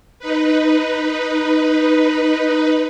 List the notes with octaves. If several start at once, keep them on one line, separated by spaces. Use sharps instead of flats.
D#4 B4